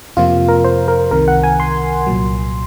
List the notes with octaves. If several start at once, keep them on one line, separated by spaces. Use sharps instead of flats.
F2 C3 F3 A#3 F4
A#4
C5
A#4
C2 C3 D#3 A#4
F#5
G#5
C6
C2 A#2 F#3